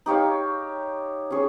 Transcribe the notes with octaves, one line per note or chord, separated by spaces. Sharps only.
D#4 G4 C#5 F5
C#4 G#4 C#5